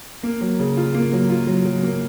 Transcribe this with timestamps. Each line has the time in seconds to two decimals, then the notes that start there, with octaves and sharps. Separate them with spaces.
0.23 A#3
0.41 F#3
0.59 C#3
0.77 F4
0.94 A#3
1.13 F#3
1.30 F4
1.47 F#3
1.65 F#3
1.83 A#3